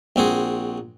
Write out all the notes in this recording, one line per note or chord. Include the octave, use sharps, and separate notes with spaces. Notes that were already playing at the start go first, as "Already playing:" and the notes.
A#1 C4 F#4 G#4